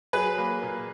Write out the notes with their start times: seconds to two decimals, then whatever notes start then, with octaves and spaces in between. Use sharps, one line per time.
0.13 F#3 G#4 B4
0.38 A#3
0.62 A#2